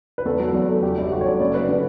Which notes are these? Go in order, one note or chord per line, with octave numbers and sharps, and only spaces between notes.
B4
E2 A4
F#3
E2
A3
F#3 G4
G1
A3 F#4
C#5
A3 D5
F#1 D5
F#1 B4
D3